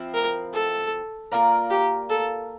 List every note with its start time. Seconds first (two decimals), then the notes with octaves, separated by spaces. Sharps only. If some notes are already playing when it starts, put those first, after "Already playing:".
Already playing: F3 C4 E4
0.14 A#4
0.54 A4
1.32 A#3 F4 A#4 D5
1.70 G4
2.10 A4